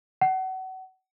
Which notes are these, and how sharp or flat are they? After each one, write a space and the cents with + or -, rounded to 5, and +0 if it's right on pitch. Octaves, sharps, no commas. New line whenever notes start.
F#5 +30